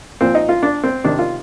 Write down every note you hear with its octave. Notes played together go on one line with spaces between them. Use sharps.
A#2 F3 C4
D#4
F4
D4
C4
C3 D#3 D4
F4